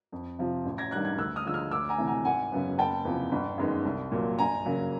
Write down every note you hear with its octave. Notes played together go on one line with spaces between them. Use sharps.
F2
C3 F3
A1
G#6 A#6
G2 D#3 G3 F#6 G#6
F#6 G#6
D2 E6 F#6
D#6 F6
D3 F3 G#3 E6
D#6 F6
D2 D6 E6
G#5 A#5
C3 E3 A3
G#5 A#5
G#1 F#5 G#5
F#2 C#3 F#3 B3
F#1 G5 A5
E2 C3 F3
G1
F#2 D#3 G#3 B3
C2
A#2 F#3 A#3
G1 G#5 A#5
F#2 C#3 F#3 A#3